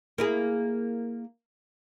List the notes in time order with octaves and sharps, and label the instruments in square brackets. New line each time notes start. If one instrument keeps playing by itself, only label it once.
[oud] A#3 E4 G#4